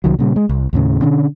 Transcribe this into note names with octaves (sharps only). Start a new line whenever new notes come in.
C2 D#3 F#3
A#2 C#3 G3
G#3
C2
D#2 A2 C#3
B2 D3 C#4 D4